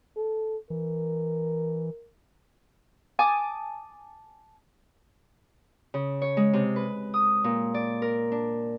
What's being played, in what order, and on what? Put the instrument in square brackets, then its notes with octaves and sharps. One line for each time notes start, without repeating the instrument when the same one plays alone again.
[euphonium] A4
[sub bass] E3 [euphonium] A#4
[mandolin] G#5 A5 D6 D#6
[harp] C#3
C#5
G#3
C3
B4
D#6
A#2
D5
A#4
D4